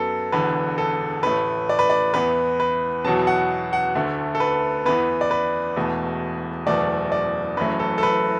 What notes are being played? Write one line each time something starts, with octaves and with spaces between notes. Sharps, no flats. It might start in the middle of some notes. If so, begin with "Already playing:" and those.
Already playing: F#2 F#3 B3 A4
E1 E2 D3 B4
A4
A1 A2 A3 B4
D5
B4
D5
E2 E3 B3 B4
B4
E2 B2 F#3 B3 A5
F#5
F#5
D2 D3 A3
A4
B4
E2 E3 B3 B4
D5
B4
E1 E2 B2 A3
F#1 E2 B2 A3 D5
D5
F#1 F#2 E3 A3 B4
A4
A4
B4